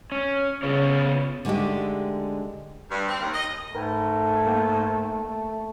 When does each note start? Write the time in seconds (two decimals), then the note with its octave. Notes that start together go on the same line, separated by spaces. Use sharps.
0.12 C#4
0.63 C#3 B3 F4 C#5
1.45 D3 G#3 A3 D#4 G4
2.90 G2
3.07 C4
3.20 D#2
3.34 D#5
3.75 G#2 A3 A#4 B4 G5
4.47 A#3 G5
5.18 A3